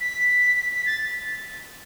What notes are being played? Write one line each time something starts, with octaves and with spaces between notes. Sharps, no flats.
B6
B6
A6